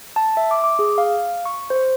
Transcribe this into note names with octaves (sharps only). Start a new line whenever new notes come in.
A5
E5
D6
D6
G#4
F5
C#6
C5